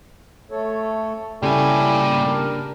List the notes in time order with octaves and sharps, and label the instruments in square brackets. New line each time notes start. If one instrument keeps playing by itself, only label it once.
[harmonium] A3 A4 C#5
[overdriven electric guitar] A#2 G#5 [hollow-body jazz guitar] C#3 [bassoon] G3 [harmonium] C#4 E4 A4
[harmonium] D4 A#4